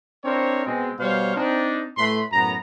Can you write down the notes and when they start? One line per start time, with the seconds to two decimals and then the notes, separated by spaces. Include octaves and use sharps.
0.24 C4 D4 E4 A#4 C5 C#5
0.65 B2 G#3 C4
0.99 B2 G3 C5 C#5 F5
1.35 C4 D4 D#4
1.97 A2 A3 B4 B5 C6
2.33 F#2 A2 B3 A#5